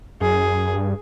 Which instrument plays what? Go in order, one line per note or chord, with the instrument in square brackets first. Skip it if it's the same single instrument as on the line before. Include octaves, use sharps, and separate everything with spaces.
[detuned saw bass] F#2 [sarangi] G#4
[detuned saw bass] G2